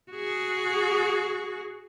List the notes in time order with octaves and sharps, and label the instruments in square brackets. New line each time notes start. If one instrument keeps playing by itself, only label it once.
[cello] F#4 G#4